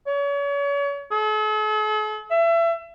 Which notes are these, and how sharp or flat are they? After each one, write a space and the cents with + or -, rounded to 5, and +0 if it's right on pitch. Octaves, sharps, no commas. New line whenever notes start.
C#5 +40
A4 -45
E5 +30